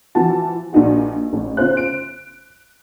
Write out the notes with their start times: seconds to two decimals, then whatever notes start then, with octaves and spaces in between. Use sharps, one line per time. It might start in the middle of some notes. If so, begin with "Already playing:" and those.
0.15 E3 F3 F#4 A5
0.73 A#1 D4 D#4 F#4
1.33 A1
1.57 C#3 F4 C5 F#6
1.77 D7